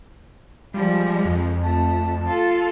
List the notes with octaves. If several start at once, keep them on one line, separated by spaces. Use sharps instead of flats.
F3 G3 G#3
F2
A3 A5
F4 A4